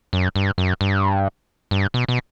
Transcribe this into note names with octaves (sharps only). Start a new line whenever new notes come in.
F#2
G2
F#2
G2
G2
B2
B2